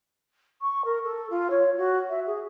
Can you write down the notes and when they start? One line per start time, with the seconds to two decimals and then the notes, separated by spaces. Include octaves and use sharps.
0.61 C#6
0.85 A#4
1.04 A4
1.30 F4
1.50 C#5
1.77 F#4
2.10 E5
2.26 G#4